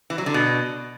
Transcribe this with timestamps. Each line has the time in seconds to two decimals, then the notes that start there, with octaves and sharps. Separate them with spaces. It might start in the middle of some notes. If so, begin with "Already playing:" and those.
0.10 E3
0.18 F#3
0.26 D3
0.34 B2